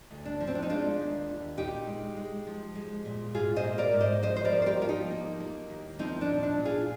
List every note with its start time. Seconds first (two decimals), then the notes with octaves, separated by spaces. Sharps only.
0.11 D2
0.25 D4
0.40 F3
0.47 C4
0.55 D4
0.62 D#4
0.69 G#3 D4 F4
0.99 D#2
1.29 D#2
1.57 A#2 D#4 G4
1.87 G#3
2.17 G#3
2.47 F3
2.75 G#3
3.05 A#2
3.35 G#2 F4 G#4
3.56 C5 D#5
3.64 A#3
3.78 A#4 D5
3.93 G#2
4.00 C5 D#5
4.22 F3 C5 D#5
4.36 C5
4.45 A#4 D5
4.52 F3
4.62 C5
4.66 G4 A#4
4.81 F3 F4
4.89 D#4 G4
5.11 A#3
5.40 A#3
5.70 D#2
5.99 F3 C4 D#4
6.21 D4
6.29 A#2
6.43 D4
6.58 A#2
6.65 F4 G#4